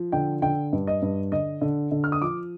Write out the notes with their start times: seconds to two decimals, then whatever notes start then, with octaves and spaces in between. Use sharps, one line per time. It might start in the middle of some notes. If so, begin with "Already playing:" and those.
Already playing: F3
0.12 D3 G5
0.42 D3 G5
0.73 G2
0.87 D#5
1.02 G2
1.32 D3 D#5
1.61 D3
1.92 D3
2.04 F6
2.12 D#6
2.21 F3 D6